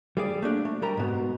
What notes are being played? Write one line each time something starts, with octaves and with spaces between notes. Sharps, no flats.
G3 G#4 D5
A3 A#3 D4
A3
G3 A#4 A#5
G#2 B2